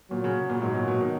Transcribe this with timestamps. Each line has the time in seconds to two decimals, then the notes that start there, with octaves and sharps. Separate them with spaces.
0.11 A#2 F#3
0.24 C#3
0.50 A#2
0.62 G#2 F#3
0.75 A#2
0.88 B2
1.01 D#3